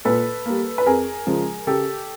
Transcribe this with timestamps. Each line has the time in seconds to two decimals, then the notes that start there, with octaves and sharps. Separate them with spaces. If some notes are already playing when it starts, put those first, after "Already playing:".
0.05 A#2 A4 B4
0.46 G3 A#3
0.78 B4
0.86 F2 G#4 A#4
1.26 C#3 F3 G#3
1.67 C#3 G4 A4